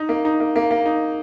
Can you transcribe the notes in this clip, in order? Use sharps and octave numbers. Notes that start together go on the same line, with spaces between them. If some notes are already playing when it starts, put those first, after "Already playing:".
Already playing: D#4
A#3
D#4
A#3
A#3
A#3
D#4